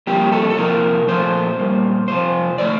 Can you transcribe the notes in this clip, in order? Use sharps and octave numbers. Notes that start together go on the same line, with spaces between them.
G2 F3 A#3 G4
A4
A4
F2 C3 F3 A#3 A#4
A#2 F3 A3 C5
A#2 G3 A#3
F2 C3 F3 C5
D#3 A3 D5